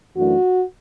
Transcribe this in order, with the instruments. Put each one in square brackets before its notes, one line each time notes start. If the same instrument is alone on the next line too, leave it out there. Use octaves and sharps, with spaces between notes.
[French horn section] F#2 E3 A3 D4 F#4